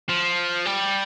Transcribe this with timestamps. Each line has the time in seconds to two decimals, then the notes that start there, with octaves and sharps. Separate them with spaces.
0.09 F3
0.65 G3